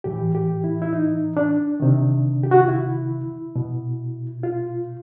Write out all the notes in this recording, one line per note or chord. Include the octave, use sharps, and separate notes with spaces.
A2 E3 G4
G4
E4
E4
D#4
D4
C3 D#3
G4
F#4
F4
E4
B2
F4